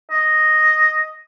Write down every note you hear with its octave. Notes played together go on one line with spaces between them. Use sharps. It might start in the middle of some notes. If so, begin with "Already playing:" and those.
D#5